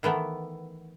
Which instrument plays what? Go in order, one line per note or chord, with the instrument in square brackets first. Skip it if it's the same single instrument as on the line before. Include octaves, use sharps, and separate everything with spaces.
[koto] D#3 E3 A3 B3